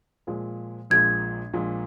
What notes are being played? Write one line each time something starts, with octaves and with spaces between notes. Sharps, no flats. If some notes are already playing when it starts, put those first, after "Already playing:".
A#2 F3 G#3
A#1 A#2 F3 G#3 G#6
A#1 A#2 F3 G#3